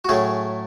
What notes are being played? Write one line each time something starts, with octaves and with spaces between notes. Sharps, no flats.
F#4
A2 F#3 A3 C#4 G#4